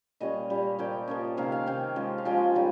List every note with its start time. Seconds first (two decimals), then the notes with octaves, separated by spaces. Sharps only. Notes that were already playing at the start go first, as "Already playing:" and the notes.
0.20 A#2 G3 C#4 D#5
0.50 A#2 G3 C#4
0.79 F3 A#3 C#4 G5
1.08 F3 A#3 C#4
1.37 C3 D#3 A#3 C#4 F5
1.52 F5
1.66 C3 D#3 A#3 C#4 G5
1.96 F3 G#3 C#4
2.18 F5
2.25 F3 G#3 C#4 G5
2.55 D#3 G3 C#4